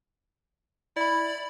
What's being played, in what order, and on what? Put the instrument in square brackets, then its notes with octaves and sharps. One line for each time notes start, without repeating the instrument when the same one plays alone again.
[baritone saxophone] E4 [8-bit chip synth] D5 B5